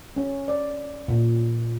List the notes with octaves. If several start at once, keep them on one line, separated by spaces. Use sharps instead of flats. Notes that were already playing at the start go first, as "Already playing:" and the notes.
C#4
D5
A#2